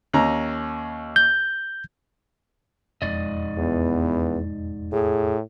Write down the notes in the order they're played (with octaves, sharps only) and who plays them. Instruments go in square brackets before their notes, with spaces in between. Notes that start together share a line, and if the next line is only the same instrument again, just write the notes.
[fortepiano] D#2 C#4 A#5
[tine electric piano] G6
[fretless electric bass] E1 F2 G#3 [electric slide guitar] G#2 D5 D#5
[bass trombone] E2 [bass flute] B3
[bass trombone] A2 [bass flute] G#4